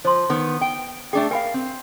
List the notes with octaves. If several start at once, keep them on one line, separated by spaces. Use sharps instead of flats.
F3 C5 C6
D#3 B3
G5
A3 D4 G#4 G5
A#4 F5 G5 G#5 B5
C4